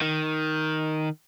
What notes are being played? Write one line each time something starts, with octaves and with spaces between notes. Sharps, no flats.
D#3